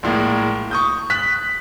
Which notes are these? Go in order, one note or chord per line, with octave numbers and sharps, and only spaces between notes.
A#1 A2 G#3 A#3
C#6 D#6 G6
F#6 B6